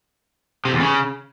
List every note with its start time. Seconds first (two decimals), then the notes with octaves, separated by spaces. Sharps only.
0.65 C3
0.73 E2
0.80 C#3